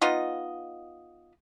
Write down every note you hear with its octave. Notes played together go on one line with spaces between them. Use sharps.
B3 D#4 F4 D#5